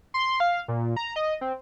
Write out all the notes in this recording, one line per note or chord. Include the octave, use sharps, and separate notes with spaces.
C6
F5
A#2
A#5
D#5
C4